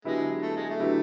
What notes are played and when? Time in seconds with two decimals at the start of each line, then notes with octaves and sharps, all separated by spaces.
0.04 D3 F#3 G#3 B3 E4 G4
0.42 A3
0.56 G#3
0.70 A3
0.80 D3 F#3 B3 E4 G4